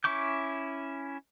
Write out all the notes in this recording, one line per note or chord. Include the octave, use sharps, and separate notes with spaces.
C#4 E4 C#6 D6 G6